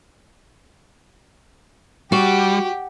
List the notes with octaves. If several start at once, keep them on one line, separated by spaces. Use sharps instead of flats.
G3 F#4 G4